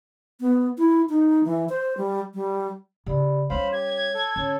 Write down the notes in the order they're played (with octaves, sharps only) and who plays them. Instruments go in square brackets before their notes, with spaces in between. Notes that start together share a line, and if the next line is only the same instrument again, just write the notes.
[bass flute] B3
E4
D#4
E3
C5
G3
G3
[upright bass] C#3 [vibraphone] G4 D5 B5
[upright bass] G3 C#4 [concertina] C5 F5 B5 [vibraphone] C#5
[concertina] G4 [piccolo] G#6
[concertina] A4
[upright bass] D3 [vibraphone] C#4 C#5